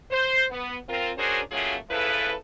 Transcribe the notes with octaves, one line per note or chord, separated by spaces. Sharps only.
C5
B3
C4 F4 A#4
C#4 D4 F#4 G#4 A#4 C5
F#3 A3 A#3 C#4 F4 G#4
C#3 F3 E4 A4 B4